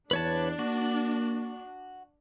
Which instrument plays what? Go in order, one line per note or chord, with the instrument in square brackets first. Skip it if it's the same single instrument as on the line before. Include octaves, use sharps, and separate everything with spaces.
[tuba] E2 [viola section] D4 [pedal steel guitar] B4 C#5 A5
[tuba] A#3 [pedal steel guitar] F#4